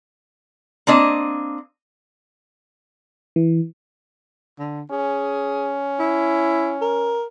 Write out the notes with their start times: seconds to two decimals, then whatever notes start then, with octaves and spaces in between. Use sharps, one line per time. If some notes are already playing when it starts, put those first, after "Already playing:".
0.87 A#3 C4 D4 D#5
3.36 E3
4.59 D3
4.91 C#4 G#4
6.00 E4
6.82 A#4